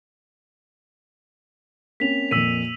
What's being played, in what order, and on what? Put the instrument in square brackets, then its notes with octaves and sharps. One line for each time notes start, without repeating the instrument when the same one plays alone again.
[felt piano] A#3 C4 C#4 [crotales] B6 F7
[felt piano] F2 A#2 [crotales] E6 B6 D#7